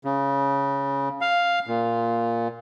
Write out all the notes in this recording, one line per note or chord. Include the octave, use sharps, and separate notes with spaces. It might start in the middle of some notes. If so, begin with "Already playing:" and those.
C#3
F5
A#2